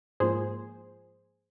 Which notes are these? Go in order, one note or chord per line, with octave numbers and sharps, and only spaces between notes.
G#2 F3 A#3 G#4 C5